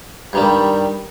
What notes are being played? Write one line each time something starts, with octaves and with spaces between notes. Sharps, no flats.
G2 D#3 G3